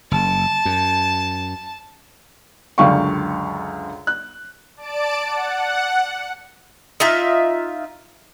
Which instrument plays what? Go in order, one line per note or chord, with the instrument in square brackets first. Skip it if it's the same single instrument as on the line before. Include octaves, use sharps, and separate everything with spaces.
[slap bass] F#1 [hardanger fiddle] A5
[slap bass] F#2
[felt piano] C#2 F#2 D3 F5 G5 C#6
F#6
[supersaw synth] D5 A5 D7
F#5
[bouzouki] D#4 F4 E5